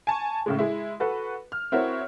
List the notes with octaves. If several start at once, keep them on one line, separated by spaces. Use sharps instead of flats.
G#5 A5 C#6
A2 C#3 G#3
G#3 E4
F#4 A4 B4
F6
C4 E4 F#4 A#4 C#5